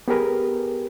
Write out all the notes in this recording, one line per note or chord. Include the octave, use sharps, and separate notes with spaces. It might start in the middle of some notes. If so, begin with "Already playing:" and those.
B3 G4 G#4 A#4 B4